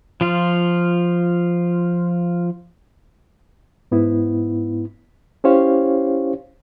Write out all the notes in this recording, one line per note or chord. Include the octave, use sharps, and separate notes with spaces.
F3 F4
G#2 B3 E4
C#4 E4 G4 C5 C#5 F5